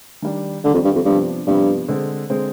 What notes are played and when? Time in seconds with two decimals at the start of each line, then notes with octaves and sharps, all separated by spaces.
0.22 D#3 G3 D4
0.64 D3 D#3 G3 D4
0.74 F2
0.85 G2
0.95 F2
1.05 G2 C3 F3 B3 D4
1.47 G2 C3 F3 B3 D4
1.88 D3 G#3 C4
2.30 D3 G#3 C4